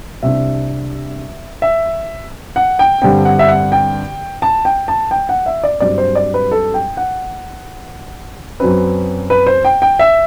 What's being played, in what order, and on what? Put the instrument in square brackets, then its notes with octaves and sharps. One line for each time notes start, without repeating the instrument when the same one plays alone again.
[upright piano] C2 C3 G3 D4 E5
E5
F#5
G5
G2 D3 G3 C4 G5
F#5
E5
F#5
G5
A5
G5
A5
G5
F#5
E5
D5
G2 F#3 C4 D5
C5
D5
B4
A4
G5
F#5
F#2 F#3 C4 B4
B4
C5
G5
G5
E5